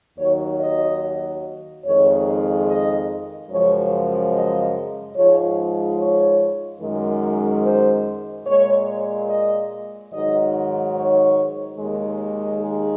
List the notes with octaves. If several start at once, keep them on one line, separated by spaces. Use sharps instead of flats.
D#2 D#3 F#3 C#5
D#5
F2 D#3 G#3 C#5
D#5
F#2 C#3 F3 G#3 C#5
D#5
G#2 F3 G#3 C#5
C#5
F#2 D#3 G#3
C5
A#2 G#3 C#5
D#5
G#2 D#3 F#3 D#5
C#5
D#2 D#3 G#3
G#4